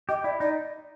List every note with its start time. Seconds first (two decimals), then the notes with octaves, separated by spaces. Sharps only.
0.09 G4 D#5
0.24 E4 D5
0.40 D#4 D5